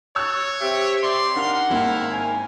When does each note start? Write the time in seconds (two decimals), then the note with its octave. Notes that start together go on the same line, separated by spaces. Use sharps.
0.16 C#5 E6 F#6 A6
0.61 C4 G4 E5
1.03 D5 C6
1.36 D#3 D4 A#4 F5 F#5
1.70 G#1 A#3 E4 G5
2.10 G#5